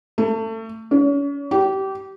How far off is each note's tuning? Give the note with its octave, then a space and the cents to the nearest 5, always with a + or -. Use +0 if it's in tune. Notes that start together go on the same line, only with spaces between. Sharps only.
A3 +25
C#4 +35
G4 -25